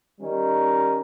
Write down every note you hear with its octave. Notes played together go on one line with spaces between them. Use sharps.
D#3 G3 C#4 D#4